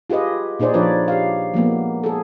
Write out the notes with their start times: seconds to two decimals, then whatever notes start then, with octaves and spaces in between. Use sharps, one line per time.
0.10 F4 G4 G#4 B4 D#5
0.60 A#2 D#4 G#4 C5 D5
0.74 F3 D4 F4 B4 C#5 D5
1.08 G4 F5
1.54 F3 G#3 A#3 B3
2.04 G#4 A4